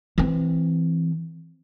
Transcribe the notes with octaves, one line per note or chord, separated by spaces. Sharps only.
E3 C4